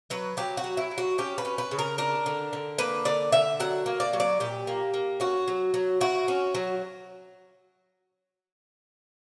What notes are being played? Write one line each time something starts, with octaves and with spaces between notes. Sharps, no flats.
F#3 B4
F#3 G4
F#4
F#3
E4
F#3
F#4
C#4 G4
B4
C#4
B4
C#3
A#4
D4 A#4
D3
D3
A#3 B4
D3 D5
D3 E5
F#3 F#5
A#3
D5
F#3
D5
A#2 G4
A#3
A#3
C#4 F#4
F#3
F#3
E4 F#4
C#4
F#3